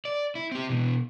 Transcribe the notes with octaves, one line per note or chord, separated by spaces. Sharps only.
D5
E4
C4 G4
B2 E3